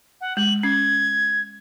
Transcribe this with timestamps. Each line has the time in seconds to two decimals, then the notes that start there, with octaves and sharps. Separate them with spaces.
0.21 F#5
0.37 G#3 F#7
0.63 C#4 G#6